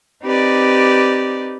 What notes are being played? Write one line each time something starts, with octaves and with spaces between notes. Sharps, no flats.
C4 D#4 G4 B4 D5